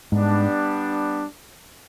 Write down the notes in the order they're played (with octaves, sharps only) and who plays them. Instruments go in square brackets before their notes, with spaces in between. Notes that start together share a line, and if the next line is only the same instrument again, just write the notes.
[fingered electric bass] G#2 [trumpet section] G3 B3 D4